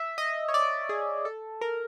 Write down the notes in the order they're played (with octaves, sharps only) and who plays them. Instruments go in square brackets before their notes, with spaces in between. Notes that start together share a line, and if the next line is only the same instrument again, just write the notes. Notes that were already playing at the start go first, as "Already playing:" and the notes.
Already playing: [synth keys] E5
D#5
C#5
D5
G#4
A4
A#4